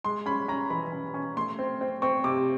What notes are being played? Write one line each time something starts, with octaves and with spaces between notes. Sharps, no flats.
G#3 C6
C#4 B5
C#4 A#5
E3 B5
C#4
C#4
A3 C6
C4
C4
C4 C#6
C3 D6